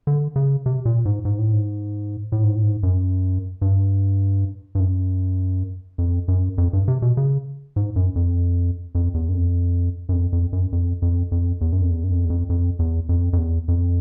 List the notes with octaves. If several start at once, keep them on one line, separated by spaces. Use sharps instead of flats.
D3
C#3
C3
A#2
G#2
G#2
A2
G#2
A2
G#2
A2
G#2
F#2
G2
G2
F#2
F2
F#2
F2
G2
C3
B2
C#3
G#2
F#2
F2
F2
E2
F#2
F2
F#2
F2
F2
F#2
F2
F2
F2
E2
F#2
F2
E2
F#2
F2
E2
F2
F2
E2
F2
F2
E2
F2